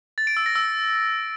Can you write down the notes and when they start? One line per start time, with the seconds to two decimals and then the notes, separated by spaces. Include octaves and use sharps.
0.18 A6
0.27 D7
0.37 E6
0.46 A#6
0.55 E6